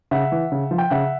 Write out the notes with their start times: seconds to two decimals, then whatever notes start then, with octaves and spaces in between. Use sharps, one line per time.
0.11 C#3 E5 F#5
0.32 E3
0.52 C#3
0.71 F3
0.78 G5
0.90 C#3 E5 F#5